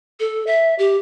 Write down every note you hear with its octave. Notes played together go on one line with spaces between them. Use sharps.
A4
E5
G4